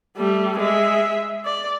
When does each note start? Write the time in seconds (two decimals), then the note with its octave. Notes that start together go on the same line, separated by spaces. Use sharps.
0.17 G3 A3
0.58 G#3 E5
1.45 D5